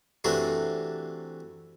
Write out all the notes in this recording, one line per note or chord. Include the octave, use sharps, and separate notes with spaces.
C3 E3 A3 D4 F#4